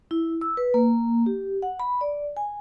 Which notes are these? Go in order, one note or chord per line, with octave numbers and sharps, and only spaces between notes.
E4
E6
B4
A#3
G4
F#5
B5
D5
G#5